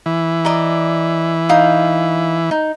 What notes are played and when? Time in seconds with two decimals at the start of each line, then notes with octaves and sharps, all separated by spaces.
0.06 E3
0.45 D5 D#5 A#5
1.49 D#4 F5 D#6
2.51 D#4